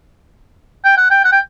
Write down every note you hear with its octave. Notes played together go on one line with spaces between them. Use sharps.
G5
F#5
G5
F#5
G5